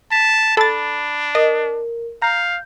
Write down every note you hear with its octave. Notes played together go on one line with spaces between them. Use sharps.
A5 B6
D4 A4 B5 A6
A#4 D#5
F5 A#5 G6